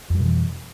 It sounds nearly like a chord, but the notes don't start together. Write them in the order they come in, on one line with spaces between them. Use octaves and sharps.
F2 G3 B2 E3